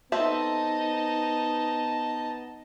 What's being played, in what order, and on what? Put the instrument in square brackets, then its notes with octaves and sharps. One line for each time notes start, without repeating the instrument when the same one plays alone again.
[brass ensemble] B3 [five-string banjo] C4 A4 E5 [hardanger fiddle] D#4 D#5 [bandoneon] A5